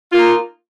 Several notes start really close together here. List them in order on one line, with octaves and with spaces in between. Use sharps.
F4 A#3 D#4